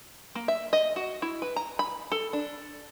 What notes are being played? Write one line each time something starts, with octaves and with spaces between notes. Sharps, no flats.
A#3
E5
D#5
F#4
E4
B4
A#5
B5
A4
D4